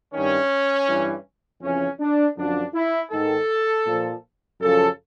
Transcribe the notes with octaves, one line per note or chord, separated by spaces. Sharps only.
G2 D#3 C#4
G2 E3
F2 C#3 E3 C#4
D4
F#2 D3 F3 D4
E4
G#2 D#3 A4
A#2 F3
F#2 C#3 F3 A4